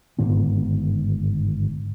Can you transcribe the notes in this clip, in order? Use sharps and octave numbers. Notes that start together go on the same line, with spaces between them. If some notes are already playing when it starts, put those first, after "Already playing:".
G1 G#2 D#3 B3